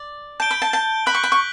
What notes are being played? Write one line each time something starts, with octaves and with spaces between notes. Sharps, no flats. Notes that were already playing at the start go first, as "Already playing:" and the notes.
Already playing: D5
A5 G6 D7 G7
B5
A5
A5
B5 F#6 B6 F#7
C#6
B5
C#6